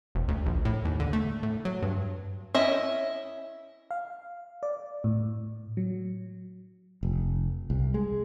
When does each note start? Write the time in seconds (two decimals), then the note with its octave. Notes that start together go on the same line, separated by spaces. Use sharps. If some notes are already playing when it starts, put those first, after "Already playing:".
0.15 E1
0.28 D2
0.46 A#1
0.65 A2
0.85 D#2
1.00 D3
1.13 A3
1.43 A2
1.65 F#3
1.82 G2
2.54 C#4 E4 D#5 E5
3.91 F5
4.63 D5
5.04 A2
5.77 F#3
7.03 F1
7.70 C2
7.94 G#3